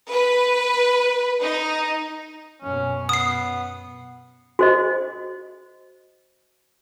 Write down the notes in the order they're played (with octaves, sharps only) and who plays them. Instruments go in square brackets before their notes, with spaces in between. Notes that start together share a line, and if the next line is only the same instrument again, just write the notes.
[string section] B4
D#4
[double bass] F#2 B2 [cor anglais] C#4
[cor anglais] B3 [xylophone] D#6 C7
[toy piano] F#4 C5 D#5